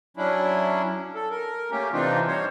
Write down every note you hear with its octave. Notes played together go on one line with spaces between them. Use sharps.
F#3 C#4 D4 E4
A4
A#4
A3 A#3 C#4 G4
C3 E3 C4 D4 D#4 F4
G3 C5 C#5